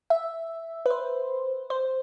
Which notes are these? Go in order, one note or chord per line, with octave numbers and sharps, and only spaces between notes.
E5
B4
C5
C5